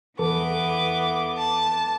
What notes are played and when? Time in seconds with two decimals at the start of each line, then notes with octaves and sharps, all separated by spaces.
0.19 E2 E3 B3 A4 B4 D6
1.38 A5